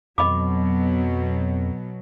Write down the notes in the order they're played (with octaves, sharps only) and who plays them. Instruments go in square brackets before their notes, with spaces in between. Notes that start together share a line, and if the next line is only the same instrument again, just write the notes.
[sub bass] F2 [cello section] B2 F#3 [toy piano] D#5 B5 D6